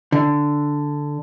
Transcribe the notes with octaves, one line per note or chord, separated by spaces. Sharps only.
D3